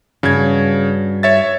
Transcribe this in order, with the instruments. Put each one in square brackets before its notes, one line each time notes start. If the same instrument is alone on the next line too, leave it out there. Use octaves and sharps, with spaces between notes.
[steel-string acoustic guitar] G2 F#4 [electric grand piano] C#3 G#6
[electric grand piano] C#5 E5 A6